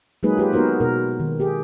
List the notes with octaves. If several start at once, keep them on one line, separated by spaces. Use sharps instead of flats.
F#3 G#3 A#3 D#4 G#4 B4
F4 G4 B4
B3 D#4 F#4 A#4 C5
B2 A#4
D#3
G4 G#4